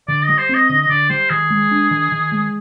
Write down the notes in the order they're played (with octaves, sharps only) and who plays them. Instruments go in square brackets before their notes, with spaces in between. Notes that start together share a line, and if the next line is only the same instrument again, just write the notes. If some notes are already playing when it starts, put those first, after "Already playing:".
[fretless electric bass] D3 [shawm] D5
[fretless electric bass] G3 [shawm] D#5
[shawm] C5
[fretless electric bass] C4
[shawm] D#5
[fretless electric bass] D3 [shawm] D#5
[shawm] D#5
[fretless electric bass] D3 [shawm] D5
[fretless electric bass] G3 [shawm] C5
[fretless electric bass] D#3 [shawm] G#4
[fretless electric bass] G#3
D4
D#3
D#3
G#3